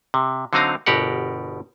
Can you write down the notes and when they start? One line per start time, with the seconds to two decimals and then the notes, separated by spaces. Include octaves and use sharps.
0.14 C3
0.53 D3 F#3 C4 D#4 F5 A#5
0.86 G1 B2 G4 A#4 F#5